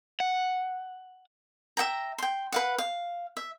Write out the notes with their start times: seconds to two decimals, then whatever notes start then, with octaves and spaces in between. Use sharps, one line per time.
0.20 F#5
1.77 E5 F#5 G5 A#5
2.18 G5 C6
2.52 B4 F5 F#5
2.78 F5
3.37 E5